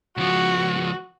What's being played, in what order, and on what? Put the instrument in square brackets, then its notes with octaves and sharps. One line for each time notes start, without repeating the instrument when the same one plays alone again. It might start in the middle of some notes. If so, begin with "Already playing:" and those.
[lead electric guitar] C#2 F3 [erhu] F#4